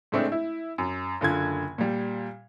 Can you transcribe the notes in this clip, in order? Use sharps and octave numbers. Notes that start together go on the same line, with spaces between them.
A2 G#3 A3 C4 D4
E4
F#2
F#1 D3 F4 G#6
A#2 G3